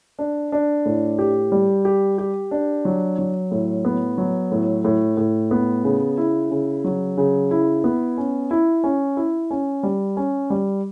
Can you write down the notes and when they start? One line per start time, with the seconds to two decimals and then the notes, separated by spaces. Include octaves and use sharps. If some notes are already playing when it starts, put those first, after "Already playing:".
0.19 D4
0.52 D4
0.86 A2
1.19 G4
1.52 G3
1.85 G4
2.18 G4
2.51 D4
2.85 F#3
3.19 F#3
3.51 A2
3.85 B3
4.18 F#3
4.51 A2
4.85 A2
5.17 A2
5.51 B3
5.84 C#3
6.18 E4
6.51 C#3
6.85 F#3
7.17 C#3
7.51 E4
7.84 B3
8.18 C#4
8.51 E4
8.84 C#4
9.17 E4
9.51 C#4
9.83 G3
10.17 C#4
10.50 G3